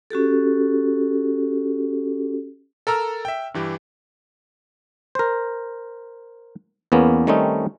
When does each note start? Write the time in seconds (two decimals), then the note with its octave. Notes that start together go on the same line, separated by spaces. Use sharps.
0.11 C#4 F#4 G4 A4
2.87 A4 A#4 A#5 E6 F6
3.25 E5 G5
3.54 G2 E3 G4
5.15 A#4 C5
6.92 E2 A#3 B3 C#4
7.27 D#3 G3 A3 C4 C#4 D#4